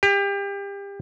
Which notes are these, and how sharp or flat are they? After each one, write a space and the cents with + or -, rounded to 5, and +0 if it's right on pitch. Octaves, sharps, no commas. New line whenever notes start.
G4 +30